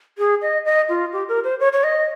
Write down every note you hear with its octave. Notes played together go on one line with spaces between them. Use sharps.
G#4
D#5
D#5
F4
G4
A#4
C5
C#5
C#5
D#5